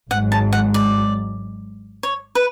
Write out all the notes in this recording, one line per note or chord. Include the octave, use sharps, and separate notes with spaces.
G#1 G#2 F#3 F#5
A5
F#5
D5
C#5
B4